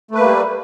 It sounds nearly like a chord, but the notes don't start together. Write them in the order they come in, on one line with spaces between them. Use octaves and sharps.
A3 B4 A#3 G3